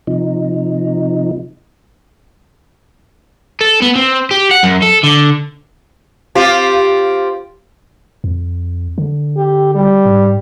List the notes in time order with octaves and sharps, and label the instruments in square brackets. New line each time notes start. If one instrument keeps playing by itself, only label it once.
[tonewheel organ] C3 F3 D#4
[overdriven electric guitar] A4
B3
C4
G4
F#5
F#2
A4
D3
[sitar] C4 F4 G4
[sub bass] F2
D3
[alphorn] G4
G3
[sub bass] G#2